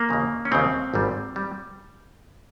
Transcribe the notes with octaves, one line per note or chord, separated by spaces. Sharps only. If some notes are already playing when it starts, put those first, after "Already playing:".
Already playing: A#3
D#2 C#3 F3
C#4
D#2 C#3 F3 C4
G#1 G#2 G3
G3